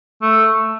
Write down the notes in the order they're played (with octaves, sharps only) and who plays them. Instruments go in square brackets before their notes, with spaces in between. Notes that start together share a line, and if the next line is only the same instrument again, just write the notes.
[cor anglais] A3